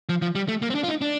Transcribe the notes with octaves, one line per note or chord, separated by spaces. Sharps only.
F3
F3
G3
A3
A#3
C4
D4
F4
D#4
D4